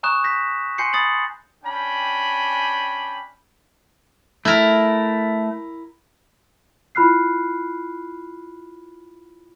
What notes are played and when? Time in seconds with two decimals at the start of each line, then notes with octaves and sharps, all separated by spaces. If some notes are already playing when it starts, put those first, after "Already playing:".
0.03 G#5 A#5 C#6 D#6 F#6 E7
0.24 G6 A#6 B6
0.78 G#5 C6 G6 C7 C#7
0.93 B5 D#6 A6 C7 F#7
1.64 C#4 D4 G5 G#5 B5
4.45 A3 E4 A#4
6.95 E4 F4 B5 F6 F#6 C7